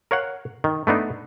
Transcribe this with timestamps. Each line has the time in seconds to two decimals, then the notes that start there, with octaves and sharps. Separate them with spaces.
0.11 A#4 C#5 F5 F#5
0.64 D#3
0.87 A3 B3 D4 D#4